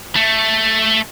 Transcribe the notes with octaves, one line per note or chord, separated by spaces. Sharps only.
A3